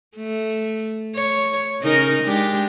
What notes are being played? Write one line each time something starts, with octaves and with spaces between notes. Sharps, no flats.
A3
C#5
C#3 D#4 A#4
G#3 D4 G4